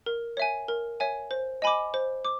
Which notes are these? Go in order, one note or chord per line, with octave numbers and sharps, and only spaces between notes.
A#4
C#5 E5 G#5
A#4
C#5 E5 G#5
C5
D#5 G#5 B5 D6
C5
D6